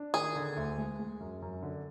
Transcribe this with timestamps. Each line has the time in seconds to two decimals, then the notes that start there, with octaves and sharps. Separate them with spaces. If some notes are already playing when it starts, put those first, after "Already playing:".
Already playing: D4
0.14 D#3 G#4
0.36 D3
0.57 D2
0.78 G#3
0.99 G#3
1.20 F#2
1.42 F#2
1.63 D3